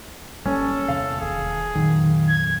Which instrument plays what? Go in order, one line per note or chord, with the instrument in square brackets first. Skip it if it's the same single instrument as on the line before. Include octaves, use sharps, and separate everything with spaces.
[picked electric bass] G1 G3 A#3 [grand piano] C#4 [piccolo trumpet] A4
[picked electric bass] E2 C3 E3 [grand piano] F5
[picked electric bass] E1 D#2 [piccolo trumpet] G#4
[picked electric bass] F2 A#2 F#3 [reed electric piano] D#3
[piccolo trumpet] G#6